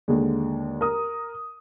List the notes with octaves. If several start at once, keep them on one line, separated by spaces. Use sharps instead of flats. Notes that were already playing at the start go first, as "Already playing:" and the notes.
D#2 D3 G#3
A#4 D#6